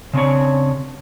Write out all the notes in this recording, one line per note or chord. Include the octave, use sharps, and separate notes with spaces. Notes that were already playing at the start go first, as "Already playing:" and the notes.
C#3 C4 D4 C#5